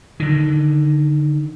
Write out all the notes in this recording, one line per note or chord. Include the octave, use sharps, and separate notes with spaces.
D3 D#3